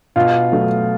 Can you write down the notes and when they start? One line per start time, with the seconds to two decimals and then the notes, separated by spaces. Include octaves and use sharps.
0.16 B2 F4
0.52 F#3 A3